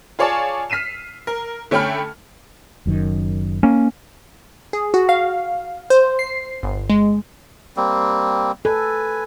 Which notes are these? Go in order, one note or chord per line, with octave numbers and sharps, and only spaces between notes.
F4 G#4 C#5 D5 G#5 A5
F6 B6 C7 D#7 E7
A#4
D3 A3 C#4 G5 B5 F6
F#1 F#2 D#3
A#3 C#4
G#4
F#4
F5
C5
C7
G1
G#3
G3 A#3 C4
A4 B4 G#5